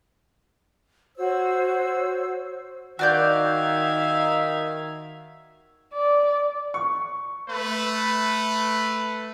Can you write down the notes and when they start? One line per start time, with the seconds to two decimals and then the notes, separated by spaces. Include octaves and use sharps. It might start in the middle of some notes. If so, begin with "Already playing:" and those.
1.16 F#4 C5 C#5 E6
2.99 D#3 F#4 D5 E5 F5 G6 G#6
5.94 D5
6.74 C#6
7.49 A3 B4